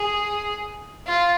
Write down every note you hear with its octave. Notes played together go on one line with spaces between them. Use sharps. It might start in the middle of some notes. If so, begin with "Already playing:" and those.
Already playing: G#4
F4